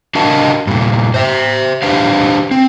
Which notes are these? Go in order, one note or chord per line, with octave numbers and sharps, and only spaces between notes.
D4 F#4 A#4 D#5 F5 A5
G2 A#2
C5 E5
D4 G4 B4 C5 F5
C4